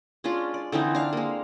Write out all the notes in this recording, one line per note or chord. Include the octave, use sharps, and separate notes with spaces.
G#3 C#4 D4 F4
D5
D3 E3 C4 D#4
D4 F5
G#3 A#3